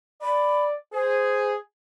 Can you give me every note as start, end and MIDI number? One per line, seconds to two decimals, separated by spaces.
0.22 0.75 74
0.22 0.65 83
0.94 1.58 68
0.94 1.51 72